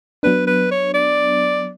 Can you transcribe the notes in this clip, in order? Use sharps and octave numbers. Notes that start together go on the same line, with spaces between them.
F#3 B3 D4 B4
B4
C#5
D5